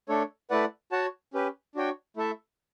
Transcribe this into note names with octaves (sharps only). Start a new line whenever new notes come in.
A3 D4 A4 C#5
A3 E4 B4 D5 F#5
F#4 C#5 F#5 A5
C#4 G4 B4
D4 F#4 C#5 G5
A3 E4 A4 E5 A5